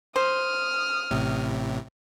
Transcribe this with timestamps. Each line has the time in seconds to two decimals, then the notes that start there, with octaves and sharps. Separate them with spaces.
0.16 C5 D#6 F6
1.11 A1 A2 C3